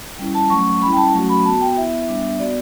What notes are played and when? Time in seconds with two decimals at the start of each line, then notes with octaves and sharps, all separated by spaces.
0.19 G3 C#4 E4
0.35 A5
0.50 F#3 A3 C#4 C#6
0.82 G3 C#4 E4 B5
0.93 G5
0.97 A5
1.13 F#3 A3 C#4 F#4
1.29 B5
1.45 B3 F#4 A5
1.61 G5
1.77 B3 E4 E5
2.08 G3 B3 D4
2.39 B3 F#4 D5